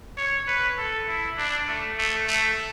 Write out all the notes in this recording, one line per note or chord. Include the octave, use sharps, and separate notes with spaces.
C#5
B4
A4
E4
D4
A3
A3
A3